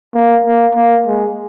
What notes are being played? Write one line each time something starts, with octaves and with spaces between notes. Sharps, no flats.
A#3
A#3
A#3
G#3